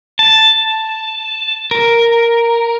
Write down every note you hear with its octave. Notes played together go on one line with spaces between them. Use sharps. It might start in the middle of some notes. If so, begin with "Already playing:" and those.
A5
A#4